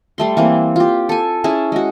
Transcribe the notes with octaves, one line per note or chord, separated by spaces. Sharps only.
G3 A3 C6
E3 A#3 C4
F4 G4
A4 G#5
C#4 E4 G#4 A5
G#3 F#4